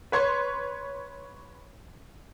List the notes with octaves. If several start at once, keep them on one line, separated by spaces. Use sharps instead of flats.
B4 C#5 C6 G#6